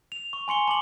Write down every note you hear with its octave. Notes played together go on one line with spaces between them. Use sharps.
F7
C#6
G#5 C6 C#7 G7
A5 D6 F#7